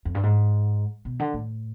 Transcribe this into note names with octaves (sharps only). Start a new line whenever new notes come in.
F2
G2
G#2
B2
D3
A2